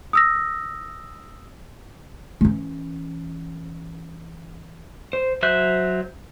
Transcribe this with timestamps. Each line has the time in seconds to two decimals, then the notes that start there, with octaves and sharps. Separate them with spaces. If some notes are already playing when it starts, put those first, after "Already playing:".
0.13 D#6 E6 A#6
2.41 E3 C#4
5.13 C5
5.43 F#3 C5 E5 F#6